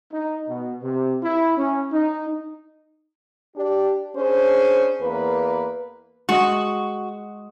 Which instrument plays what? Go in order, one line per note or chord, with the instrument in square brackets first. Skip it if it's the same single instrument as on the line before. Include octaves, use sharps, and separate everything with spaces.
[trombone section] D#4
B2
C3
E4
C#4
D#4
[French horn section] D4 G4
C#4 D4 G#4 C5
E2 A#3 B4
[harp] G#3 D#5 [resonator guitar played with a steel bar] F#4